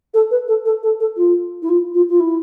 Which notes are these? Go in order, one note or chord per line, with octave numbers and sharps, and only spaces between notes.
A4
B4
A4
A4
A4
A4
F4
E4
F4
F4
F4
E4